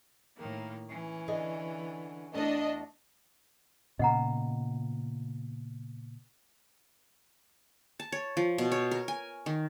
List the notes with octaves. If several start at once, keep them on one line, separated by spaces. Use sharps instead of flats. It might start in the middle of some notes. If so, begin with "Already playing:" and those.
A2 D#3 A#3
E3 C#4
D3 G#4 D#5
E2 A3 D4 D#5
A#2 C#3 B3 D#5 F#5 A#5
A5
C#5
F3
B2
C#5
A#4
G#5
D#3